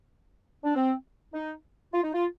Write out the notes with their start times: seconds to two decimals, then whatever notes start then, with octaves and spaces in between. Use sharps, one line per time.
0.64 D4
0.75 C4
1.34 D#4
1.94 F4
2.04 D#4
2.14 F4